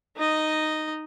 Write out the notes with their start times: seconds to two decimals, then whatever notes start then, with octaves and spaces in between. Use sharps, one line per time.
0.16 D#4 D#5